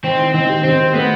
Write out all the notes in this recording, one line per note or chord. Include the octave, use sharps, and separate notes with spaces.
D#3 C4
E4
D#3 C4
G4
D#3 C4
G4
A3 B3